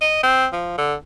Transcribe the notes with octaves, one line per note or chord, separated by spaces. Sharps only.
D#5
C4
F3
D3